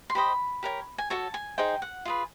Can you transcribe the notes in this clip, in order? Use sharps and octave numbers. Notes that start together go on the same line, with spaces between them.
C6
G4 C5 D#5 B5
G4 A#4 C#5
G#5
F#4 A4 C#5 A5
G#5
D#4 G#4 C5 G5
F#5
F4 G#4 B4